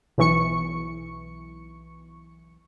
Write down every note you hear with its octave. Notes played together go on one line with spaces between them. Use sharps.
B1 E3 C#6 C#7